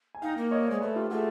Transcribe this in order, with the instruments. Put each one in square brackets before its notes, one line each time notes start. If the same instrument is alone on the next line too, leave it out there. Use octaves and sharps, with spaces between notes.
[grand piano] G#5
[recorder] D#4 [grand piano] F5 G5
[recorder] A#3
[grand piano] C#5 D#5
C5 D5
[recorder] G#3
[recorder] A3 [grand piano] B4 C#5
[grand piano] F4 G4
[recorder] A3 [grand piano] F#4 G#4